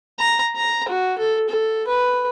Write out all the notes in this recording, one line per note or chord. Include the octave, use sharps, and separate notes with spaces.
A#5
A#5
F#4
A4
A4
B4